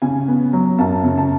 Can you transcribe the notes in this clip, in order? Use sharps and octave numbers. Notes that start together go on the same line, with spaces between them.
C#3 G#5
B3
F#3
F#2 A5
C#3
A5